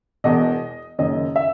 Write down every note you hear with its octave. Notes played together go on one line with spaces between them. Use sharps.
E1 E2 B2 D#5
F#1 F#2 D#3 D#5
E5